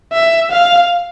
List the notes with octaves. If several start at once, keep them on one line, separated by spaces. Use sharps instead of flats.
E5
F5